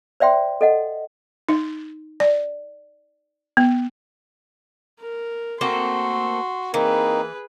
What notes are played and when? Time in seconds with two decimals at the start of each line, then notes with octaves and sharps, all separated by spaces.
0.20 C5 D5 E5 G5 C6
0.61 A4 D#5 F#5
1.49 D#4
2.20 D5
3.57 B3
5.00 A#4
5.61 A3 A#3 C4 F#4 C6
6.74 E3 A#3 C4 D#4 G#4 B4